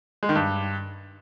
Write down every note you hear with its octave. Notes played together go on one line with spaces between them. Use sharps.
G#3
D#3
G2